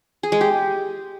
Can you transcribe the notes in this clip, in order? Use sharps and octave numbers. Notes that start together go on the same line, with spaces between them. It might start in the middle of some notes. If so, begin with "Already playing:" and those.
G#4
G#3
G4